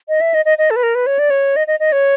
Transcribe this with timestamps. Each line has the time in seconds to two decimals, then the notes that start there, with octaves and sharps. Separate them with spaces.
0.09 D#5
0.21 E5
0.34 D#5
0.45 D#5
0.58 D#5
0.71 A4
0.76 B4
0.83 A#4
0.95 B4
1.07 C#5
1.19 D5
1.30 C#5
1.56 D#5
1.67 D#5
1.80 D#5
1.92 C#5